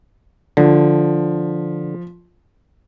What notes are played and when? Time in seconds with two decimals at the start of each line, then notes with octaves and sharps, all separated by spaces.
0.57 D3 F3